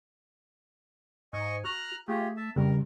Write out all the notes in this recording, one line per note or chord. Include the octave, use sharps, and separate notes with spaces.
G#2 D#5 G#5 C#6
F#4 A#5 F6 F#6
A3 F4 G4 G#4
E5 A5
F2 C#3 G3 A#4